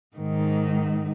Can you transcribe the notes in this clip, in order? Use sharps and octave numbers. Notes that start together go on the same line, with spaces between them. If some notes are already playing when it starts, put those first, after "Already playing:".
G#2 D#3